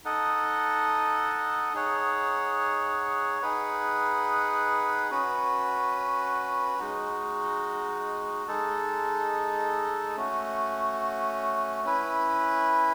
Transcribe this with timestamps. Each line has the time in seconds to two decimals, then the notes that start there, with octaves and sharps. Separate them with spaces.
0.05 D#4 A4 D#5 F#5
1.74 D#4 G#4 C#5 F#5
3.42 D#4 G#4 B4 F#5
5.11 C#4 F#4 B4
6.79 G#3 D#4 F#4
8.48 G#3 D#4 A4
10.17 A3 C#4 F#4
11.85 C#4 E4 B4